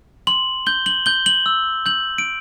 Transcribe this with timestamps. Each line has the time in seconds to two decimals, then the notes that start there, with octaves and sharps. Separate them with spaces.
0.27 C6 F#7
0.67 G6 G7
0.86 F#7
1.06 G6 G7
1.26 F#7
1.46 E6
1.86 G6 F#7
2.18 D7